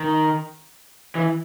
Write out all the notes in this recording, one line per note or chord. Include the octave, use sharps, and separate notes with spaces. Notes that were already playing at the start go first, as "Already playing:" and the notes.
Already playing: D#3
E3